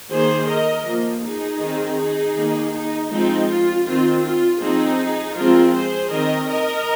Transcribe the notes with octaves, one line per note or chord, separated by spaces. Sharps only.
D#3 A#3 G#4 C5
A#4 D#5
F3 A#3
D#4 G#4
D#3
C4
D#4 G#4
D#3 A#3
D#4
F3 G#3 C4 D#4
F4
D#3 C4 F4
F4
F3 C4 D#4 G#4
F3 G#3 C4 F4 A#4
G#4 C5
D#3 C4 A#4 D#5
A#4 D#5